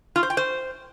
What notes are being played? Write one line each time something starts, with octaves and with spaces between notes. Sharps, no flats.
F4
C5
G5
C5